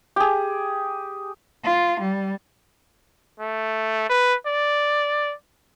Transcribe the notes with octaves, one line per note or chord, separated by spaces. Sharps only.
G4 G#4
F4
G3
A3
B4
D5